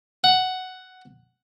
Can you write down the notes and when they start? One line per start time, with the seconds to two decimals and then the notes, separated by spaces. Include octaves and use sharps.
0.24 F#5